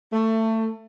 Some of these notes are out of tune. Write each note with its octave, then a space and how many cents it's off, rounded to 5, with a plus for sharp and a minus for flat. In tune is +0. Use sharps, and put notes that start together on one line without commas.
A3 +20